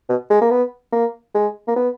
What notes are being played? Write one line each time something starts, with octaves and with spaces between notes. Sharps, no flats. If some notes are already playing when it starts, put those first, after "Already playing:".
B2
G#3
A#3
B3
A#3
G#3
A#3
B3